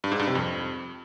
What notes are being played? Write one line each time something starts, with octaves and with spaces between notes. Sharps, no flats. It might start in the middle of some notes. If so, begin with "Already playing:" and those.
G2
G#2
G2
C3
F2